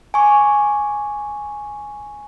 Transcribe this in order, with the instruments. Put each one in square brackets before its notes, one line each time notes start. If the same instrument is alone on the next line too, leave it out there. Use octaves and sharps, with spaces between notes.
[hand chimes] G#5 C#6 D6